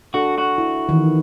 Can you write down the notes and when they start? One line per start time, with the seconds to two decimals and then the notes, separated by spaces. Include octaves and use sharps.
0.14 D4 F#4 A4
0.38 F#4
0.58 E4
0.89 D#3 E3